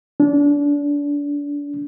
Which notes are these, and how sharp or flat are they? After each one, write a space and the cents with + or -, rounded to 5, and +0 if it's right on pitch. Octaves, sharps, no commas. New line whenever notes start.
D4 -30